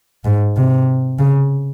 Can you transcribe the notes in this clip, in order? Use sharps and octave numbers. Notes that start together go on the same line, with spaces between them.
G#2
C3
C#3